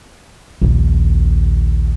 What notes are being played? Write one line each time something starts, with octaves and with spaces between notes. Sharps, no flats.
A#1 D#2